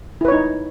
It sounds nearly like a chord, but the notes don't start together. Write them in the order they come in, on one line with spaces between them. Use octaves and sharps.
E4 B4 C#5 D#4